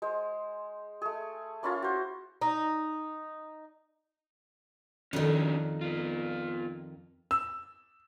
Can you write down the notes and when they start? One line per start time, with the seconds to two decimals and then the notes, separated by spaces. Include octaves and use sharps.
0.02 G#3 C5
1.02 A3 G#4
1.63 A#3 C#4 E4 F4
1.82 F#4 C5
2.42 D#4
5.13 F2 D#3 C#4 D4 F#4
5.81 B3 F4
7.31 E6